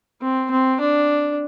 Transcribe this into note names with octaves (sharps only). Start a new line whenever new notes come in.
C4
C4
D4